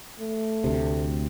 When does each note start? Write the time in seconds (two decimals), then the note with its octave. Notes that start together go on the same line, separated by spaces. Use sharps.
0.19 A3
0.64 D2 C3